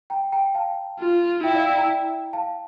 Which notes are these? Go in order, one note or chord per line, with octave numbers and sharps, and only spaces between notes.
G5 A#5
G5 A#5
F5 A5
F4
E4 E5 G5
D5 F5
E5 G5
G5 A#5
F5 A5